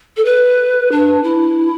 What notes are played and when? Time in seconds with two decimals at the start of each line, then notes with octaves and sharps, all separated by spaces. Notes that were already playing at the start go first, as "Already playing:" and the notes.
0.17 A4
0.25 B4
0.92 D4
1.24 E4